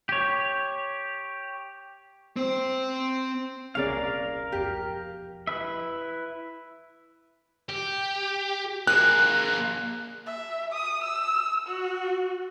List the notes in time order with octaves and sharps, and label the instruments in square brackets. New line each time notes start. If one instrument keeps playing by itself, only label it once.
[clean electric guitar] G4 C#5
[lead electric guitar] C4 C5
[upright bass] D#1 C2 [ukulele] C#4 G#4 D5 [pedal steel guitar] A#4 F5
[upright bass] E1 F2 [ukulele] G4
[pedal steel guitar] E4 B4 E5
[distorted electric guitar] G4
[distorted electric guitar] A#3 G#4 [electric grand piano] F#6
[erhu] E5
D#6
E6
F#4